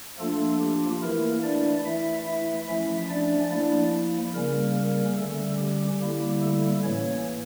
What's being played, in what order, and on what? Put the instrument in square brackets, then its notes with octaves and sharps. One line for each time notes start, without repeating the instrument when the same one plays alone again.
[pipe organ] F3 A3 A#3 D4 F4 A4
G4
E3 A3 A#3 E4 A#4
D4 D5
E3 A3 E4 E5
E4 E5
F3 A3 C#4 E4 E5
D4 D5
F3 A#3 D4 E4 D5
C#3 G3 A#3 C#4 A#4
A#3 A#4
D3 G3 A3 C#4 A4
G4
D3 G3 A#3 E4 G4
A3 A4
A2 E3 A#3 C#4 C#5